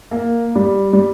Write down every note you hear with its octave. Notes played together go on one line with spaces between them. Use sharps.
A#3
G3
G3